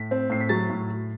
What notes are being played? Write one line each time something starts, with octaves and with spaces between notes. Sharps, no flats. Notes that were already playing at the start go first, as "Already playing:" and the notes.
Already playing: A2 B6
C4
A2 C7
B6
F#3 A6
A2